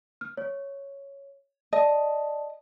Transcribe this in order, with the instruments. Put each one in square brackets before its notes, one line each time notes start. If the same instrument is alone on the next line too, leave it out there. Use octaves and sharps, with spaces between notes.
[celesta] F6
C#5
[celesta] D5 A5 [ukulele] D#5